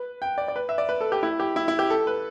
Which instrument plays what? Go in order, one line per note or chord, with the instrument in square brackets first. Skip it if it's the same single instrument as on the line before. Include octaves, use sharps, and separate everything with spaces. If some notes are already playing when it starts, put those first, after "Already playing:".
Already playing: [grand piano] B4
G5
D5
D5
B4
E5
D5
B4
A4
G4
E4
G4
E4
E4
G4
A4
B4